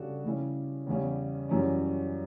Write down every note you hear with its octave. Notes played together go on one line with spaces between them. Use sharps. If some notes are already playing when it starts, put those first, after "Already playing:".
Already playing: C#3 G3 D4 F#4 A4
C#3 G3 C#4 E4 G4
E2 C#3 G3 C#4
F#2 E3 G3 C#4